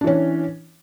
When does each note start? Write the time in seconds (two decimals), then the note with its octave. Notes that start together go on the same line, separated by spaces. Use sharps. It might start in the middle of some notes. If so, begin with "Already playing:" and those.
0.01 D4
0.04 E3
0.07 C#4